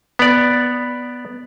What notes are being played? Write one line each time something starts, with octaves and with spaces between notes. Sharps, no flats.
B3 D5